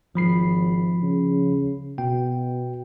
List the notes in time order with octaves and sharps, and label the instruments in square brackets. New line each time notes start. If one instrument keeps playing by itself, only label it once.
[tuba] G#1 [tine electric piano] F3 B5 C7
[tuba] C#3
[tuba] B2 [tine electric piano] G5